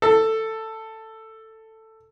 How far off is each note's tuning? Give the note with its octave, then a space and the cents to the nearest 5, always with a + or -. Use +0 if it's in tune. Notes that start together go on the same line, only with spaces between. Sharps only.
A4 +10